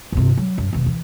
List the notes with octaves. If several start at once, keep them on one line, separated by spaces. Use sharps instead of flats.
G1 C3
F#3
F#2
E1 D#2
E3